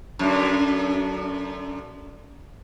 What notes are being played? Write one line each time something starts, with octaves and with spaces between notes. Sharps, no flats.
F#2 D3